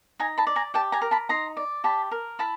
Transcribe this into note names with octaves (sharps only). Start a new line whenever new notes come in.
D#4 G#5 A#5
A5 B5
D5
G#5 A#5
G4 G5 A5
G#5 A#5
A#4
A5 B5
D#4 A#5 C6
D5
G4 A5 B5
A#4
E4 A5 B5